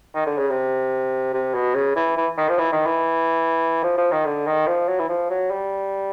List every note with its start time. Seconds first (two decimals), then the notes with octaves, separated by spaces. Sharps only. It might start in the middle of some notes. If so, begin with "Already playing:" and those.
0.14 D#3
0.26 D3
0.38 C#3
0.50 C3
1.33 C3
1.54 B2
1.75 C#3
1.96 E3
2.17 E3
2.38 D#3
2.49 F3
2.59 E3
2.72 D#3
2.86 E3
3.83 F3
3.98 F3
4.12 D#3
4.26 D3
4.46 D#3
4.67 F3
4.88 F#3
4.99 E3
5.09 F3
5.30 F#3
5.51 G3